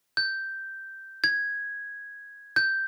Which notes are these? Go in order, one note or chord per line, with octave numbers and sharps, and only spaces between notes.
G6
G#6
G6